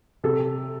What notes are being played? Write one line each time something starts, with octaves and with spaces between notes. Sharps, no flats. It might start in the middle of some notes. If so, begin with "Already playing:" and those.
C3 A4